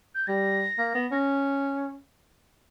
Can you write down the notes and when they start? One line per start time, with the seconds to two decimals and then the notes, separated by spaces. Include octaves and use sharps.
0.15 G6
0.27 G3 A#6
0.78 A#3
0.95 B3
1.11 C#4